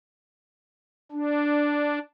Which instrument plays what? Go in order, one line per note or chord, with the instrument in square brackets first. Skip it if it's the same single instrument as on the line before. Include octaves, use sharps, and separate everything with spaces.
[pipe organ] D4